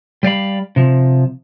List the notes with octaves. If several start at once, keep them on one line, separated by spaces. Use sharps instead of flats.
G3 D5 F5 B5
C3 F3